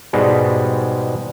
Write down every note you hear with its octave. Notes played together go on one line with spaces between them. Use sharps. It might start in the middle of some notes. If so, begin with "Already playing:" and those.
G#2 B2 G3 G#3